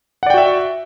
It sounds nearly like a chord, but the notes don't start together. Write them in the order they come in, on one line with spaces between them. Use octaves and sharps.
F#5 D5 G5 F#4 E5